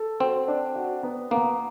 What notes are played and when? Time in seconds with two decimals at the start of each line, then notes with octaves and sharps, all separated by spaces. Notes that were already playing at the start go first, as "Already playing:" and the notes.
Already playing: A4
0.20 C4 F#4
0.48 D4
0.76 F#4
1.03 B3
1.31 A#3 B3